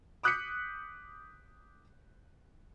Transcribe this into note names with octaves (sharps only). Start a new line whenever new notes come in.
D6 D#6 F#6 G6 B6 C#7